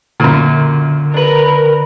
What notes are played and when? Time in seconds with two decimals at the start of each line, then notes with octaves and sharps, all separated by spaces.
0.20 F#2 A#2 D3
1.14 D4 A#4 B4